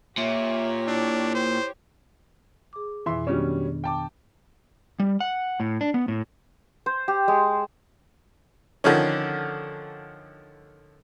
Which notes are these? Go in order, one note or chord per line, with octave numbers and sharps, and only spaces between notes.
A#2 G4 C#5 E5
D4 E4
C5
G#4 D6
F2 B2 E3 E5 C6
D#3 F#3 G3 B3 C#4 D4
G5 A5 D6
G3
F#5
A2
D4
B3
A2
C5
G4
G#3
D3 D#3 F3 C#4